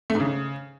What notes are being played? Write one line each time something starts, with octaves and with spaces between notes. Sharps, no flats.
A3
G#2
C#3